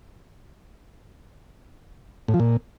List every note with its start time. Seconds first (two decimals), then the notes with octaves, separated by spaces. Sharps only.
2.28 A2
2.34 F3
2.40 A#2